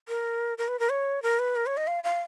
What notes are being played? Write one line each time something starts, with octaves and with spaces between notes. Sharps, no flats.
A#4
A#4
B4
A#4
C#5
A#4
B4
A#4
C#5
D#5
F5
F5